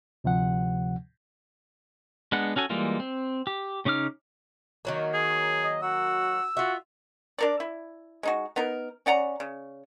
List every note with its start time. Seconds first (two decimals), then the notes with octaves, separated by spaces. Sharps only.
0.24 D2 C3 F3 F#5
2.32 G#3 B3 D4 F#5
2.56 C#4 F#4 A4 G#5
2.70 E3 G3 G#3 A#3 F4
3.00 C4
3.47 G4
3.85 C#3 C#4 D#4 D6 F6
4.85 D#3 F#3 A#3
5.14 G#4
5.63 D#5
5.82 F#4 E6
6.57 F4 F#4 E5
7.39 D4 A#4 D5
7.60 E4
8.23 G#3 D#4 F#4
8.56 B3 D#4 A#4
9.06 C#4 D5 F#5 A#5
9.40 C#3